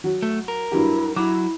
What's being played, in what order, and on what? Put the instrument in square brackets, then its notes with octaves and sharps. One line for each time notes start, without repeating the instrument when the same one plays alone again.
[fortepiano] F#3
[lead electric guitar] A3
A#4
[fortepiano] G2 F#3 G4 [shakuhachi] E4
[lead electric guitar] F#3 [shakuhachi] E4 [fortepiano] D6